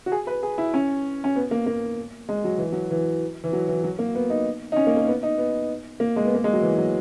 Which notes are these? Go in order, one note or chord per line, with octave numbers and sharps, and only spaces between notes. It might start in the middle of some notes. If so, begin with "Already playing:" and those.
F#4
G#4
B4
G#4
E4
C#4
C#4
B3
A#3
A#3
G#3
F#3
E3
F#3
E3
E3
F#3
E3
F#3
A#3
B3
D#4
D#4
C#4
A#3
A#3
B3
D#4
B3
A#3
G#3
B3
A#3
G#3
F#3
E3
F#3